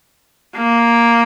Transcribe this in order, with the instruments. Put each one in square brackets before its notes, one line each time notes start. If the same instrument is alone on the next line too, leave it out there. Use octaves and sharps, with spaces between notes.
[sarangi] A#3